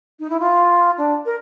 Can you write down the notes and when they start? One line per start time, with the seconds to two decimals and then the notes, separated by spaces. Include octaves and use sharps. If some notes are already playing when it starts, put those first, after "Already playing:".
0.19 D#4
0.30 E4
0.40 F4
0.97 D4
1.26 A#4